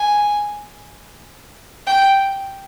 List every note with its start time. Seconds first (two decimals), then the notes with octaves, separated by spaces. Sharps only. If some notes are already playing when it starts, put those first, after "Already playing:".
Already playing: G#5
1.87 G5